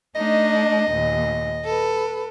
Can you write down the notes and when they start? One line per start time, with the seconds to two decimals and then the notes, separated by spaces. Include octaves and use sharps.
0.15 A3 D4 D#4 D#5
0.90 D#2 A#2
1.65 A4 B4